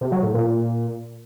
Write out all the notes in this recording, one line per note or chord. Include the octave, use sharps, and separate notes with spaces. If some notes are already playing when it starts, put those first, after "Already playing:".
C3
F#3
A2
A#2